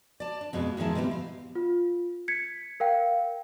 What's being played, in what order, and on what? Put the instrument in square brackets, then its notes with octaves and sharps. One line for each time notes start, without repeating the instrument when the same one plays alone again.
[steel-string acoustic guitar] D5 A5
D4
F2 B2 F3 G#3
E2 D#3 F3 G#3 E4 A5
B2 G3 C4 G4
F5
[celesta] F4
G#6 B6 C#7
A#4 F5 G5